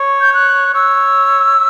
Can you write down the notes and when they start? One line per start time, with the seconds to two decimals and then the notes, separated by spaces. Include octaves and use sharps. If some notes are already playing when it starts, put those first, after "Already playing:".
Already playing: C#5
0.21 G6
0.34 F#6
0.74 C#5 E6